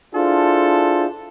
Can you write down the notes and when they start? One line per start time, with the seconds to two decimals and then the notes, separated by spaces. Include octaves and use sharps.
0.14 D4 E4 F4 G#4 A4 C5